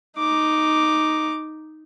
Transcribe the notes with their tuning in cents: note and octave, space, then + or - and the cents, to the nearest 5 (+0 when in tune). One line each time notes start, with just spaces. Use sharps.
D#4 +0 D6 +0